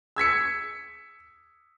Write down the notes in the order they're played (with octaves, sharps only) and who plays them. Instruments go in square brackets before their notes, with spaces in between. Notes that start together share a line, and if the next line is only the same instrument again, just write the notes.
[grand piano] E6 G#6 B6 C#7